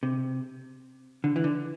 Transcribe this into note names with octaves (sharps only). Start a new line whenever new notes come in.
C3
D3
E3
D3